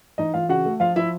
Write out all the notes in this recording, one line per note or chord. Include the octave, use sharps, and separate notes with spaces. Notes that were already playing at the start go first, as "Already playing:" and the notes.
E3 D#4 D#5
E3 F4 F5
C#3 F#4 F#5
A3
F3 F4 F5
F3 E4 E5